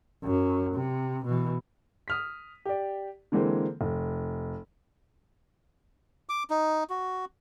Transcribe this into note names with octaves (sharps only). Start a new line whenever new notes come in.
F#2
C3
B2 E3
D#6 F6 B6
G4 D5
D3 E3 G#3 A#3 C4
F1
D6
D#4
F#4